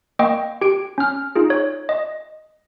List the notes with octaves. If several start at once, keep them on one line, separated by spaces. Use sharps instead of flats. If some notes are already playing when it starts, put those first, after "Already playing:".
A#3 D#5 G5 C#6
G4 D7
C#4 F6
D#4 F4 G#4
C#5
D#5